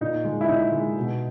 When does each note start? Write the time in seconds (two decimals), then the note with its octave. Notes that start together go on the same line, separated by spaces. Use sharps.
0.01 A#2 D#4
0.25 G#3
0.41 E4
0.48 A#2 D#4
0.72 G#3
0.96 B2